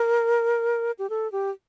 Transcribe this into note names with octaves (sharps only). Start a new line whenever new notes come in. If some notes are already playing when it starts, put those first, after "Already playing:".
Already playing: A#4
G4
A4
G4